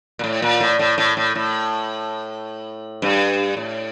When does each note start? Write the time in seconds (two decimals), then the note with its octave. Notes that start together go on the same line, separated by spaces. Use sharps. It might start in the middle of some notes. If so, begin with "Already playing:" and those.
0.19 A#2
0.24 A2
0.42 A#2
0.60 A2
0.79 A2
0.98 A2
1.17 A2
1.35 A2
3.02 G2
3.57 A2